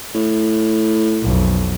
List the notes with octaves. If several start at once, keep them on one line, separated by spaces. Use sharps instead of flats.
A2
B1 F2